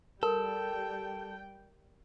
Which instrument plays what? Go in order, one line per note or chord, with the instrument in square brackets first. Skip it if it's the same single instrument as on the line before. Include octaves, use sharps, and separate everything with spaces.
[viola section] G3 G5 [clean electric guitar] A4 [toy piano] A#4